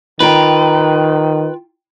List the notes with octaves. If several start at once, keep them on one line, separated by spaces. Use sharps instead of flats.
D#3 F4 B4 G5 A#5